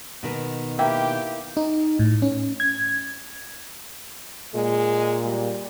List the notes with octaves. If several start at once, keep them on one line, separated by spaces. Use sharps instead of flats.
B2 D#3 B3
A#3 E4 G4 G5
D#4
A2
C#4
G#6
A#2 G#3
G3